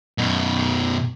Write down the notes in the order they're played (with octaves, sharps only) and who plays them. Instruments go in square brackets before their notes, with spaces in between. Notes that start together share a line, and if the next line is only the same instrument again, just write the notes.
[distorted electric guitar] F#2 B2